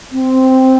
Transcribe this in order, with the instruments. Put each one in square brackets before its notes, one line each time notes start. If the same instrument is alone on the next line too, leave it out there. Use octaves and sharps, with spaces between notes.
[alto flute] C4